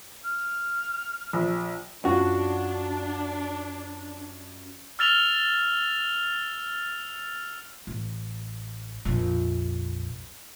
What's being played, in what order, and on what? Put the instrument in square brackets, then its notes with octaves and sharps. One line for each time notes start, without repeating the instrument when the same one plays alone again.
[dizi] F6
[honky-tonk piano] A#1
[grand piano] F#2 F4 [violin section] D4 [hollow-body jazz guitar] F#4
[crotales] E6 F6 A6 E7 F7 G7
[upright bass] A1
A#1 F2